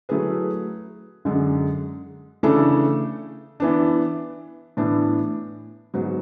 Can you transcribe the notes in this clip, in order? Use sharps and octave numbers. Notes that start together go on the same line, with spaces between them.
F#3 A3 E4 G#4 B4
F#2 D3 G#3
C#3 E3 A3 D4 A4
E3 B3 D4
A2 E3 B3 D4
G#2 F#3 B3 F#4